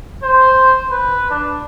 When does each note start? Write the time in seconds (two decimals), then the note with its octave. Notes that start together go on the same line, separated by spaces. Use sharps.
0.23 C5
0.91 B4
1.30 D4